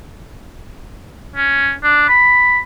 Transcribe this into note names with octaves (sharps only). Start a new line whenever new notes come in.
C#4
D4
B5